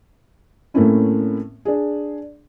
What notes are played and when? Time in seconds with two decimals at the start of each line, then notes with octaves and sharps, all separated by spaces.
0.74 A2 A3 A#3 C4 C#4 E4
1.65 D4 G#4